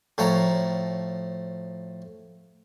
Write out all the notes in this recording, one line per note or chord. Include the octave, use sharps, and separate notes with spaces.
A2 F3 C#5 A#5